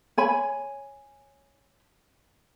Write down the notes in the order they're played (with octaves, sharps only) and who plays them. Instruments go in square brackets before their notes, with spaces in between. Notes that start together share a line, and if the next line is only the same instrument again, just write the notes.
[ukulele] C#5 G#5 B5